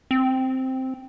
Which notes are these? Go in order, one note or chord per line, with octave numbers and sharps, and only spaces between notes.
C4